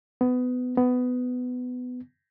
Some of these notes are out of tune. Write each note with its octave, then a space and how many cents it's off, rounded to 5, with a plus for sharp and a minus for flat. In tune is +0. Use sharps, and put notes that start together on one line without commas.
B3 +20
B3 +15